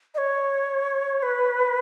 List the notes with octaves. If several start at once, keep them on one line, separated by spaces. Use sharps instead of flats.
D#5
C#5
B4